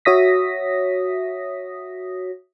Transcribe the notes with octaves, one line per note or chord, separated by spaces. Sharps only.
F#4 C#5 E5 D#6 A#6 B6